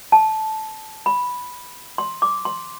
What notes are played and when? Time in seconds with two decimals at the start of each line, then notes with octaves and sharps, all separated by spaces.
0.12 A5
1.06 B5
1.98 C6
2.22 D6
2.45 C6